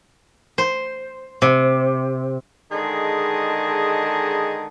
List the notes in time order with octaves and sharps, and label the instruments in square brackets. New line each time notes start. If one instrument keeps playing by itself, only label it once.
[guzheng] C5
C3
[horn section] D3 D#3 G#3 G#4 D#5 A5